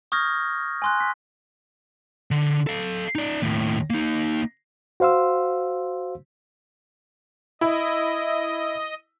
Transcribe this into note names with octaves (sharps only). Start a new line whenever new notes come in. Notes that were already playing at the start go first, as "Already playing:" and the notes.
C#6 D#6 F6 G6 G#6 A#6
G#5 C6 F#6
B6
D3
A4 F5
D#4 D5
D#2 A2
A#3 D#4
F#4 C5 F5 C6 E6
E4 D#5